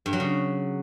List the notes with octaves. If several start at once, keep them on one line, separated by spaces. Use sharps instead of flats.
G2
F#3
C#3